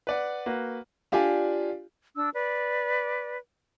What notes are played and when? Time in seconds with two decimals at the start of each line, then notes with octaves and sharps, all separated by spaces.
0.07 B4 D5 F#5
0.46 A#3 F#4 B4
1.12 D4 F4 G4 D5 G#5
2.15 D4 E6
2.33 B4 D5